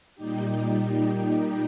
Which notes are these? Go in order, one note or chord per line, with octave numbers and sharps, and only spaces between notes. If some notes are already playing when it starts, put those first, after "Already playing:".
A#2 G3 D#4 G4